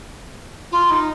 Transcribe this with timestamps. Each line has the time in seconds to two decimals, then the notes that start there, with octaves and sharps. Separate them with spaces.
0.71 F4
0.90 D#4